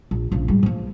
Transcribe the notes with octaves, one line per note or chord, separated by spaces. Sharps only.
A#1
A#1 C#3
G#2 G3
F3 A#3